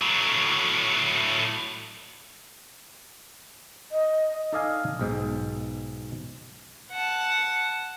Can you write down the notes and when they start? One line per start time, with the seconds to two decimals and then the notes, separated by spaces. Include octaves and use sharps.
0.02 A2 F#3
3.91 D#5
4.52 D#4 A4 D5 D#5 F5 G#5
4.99 B1 G#2 B2
6.91 F#5 A5